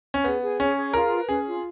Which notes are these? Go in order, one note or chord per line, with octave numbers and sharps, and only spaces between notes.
C#4
B3 G#4
G#4
C#4 C#5
G#4
F4 A#4
B4
C#4 G#4
F4